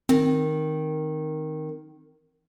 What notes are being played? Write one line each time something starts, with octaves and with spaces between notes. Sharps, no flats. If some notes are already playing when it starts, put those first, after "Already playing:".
D#3 C4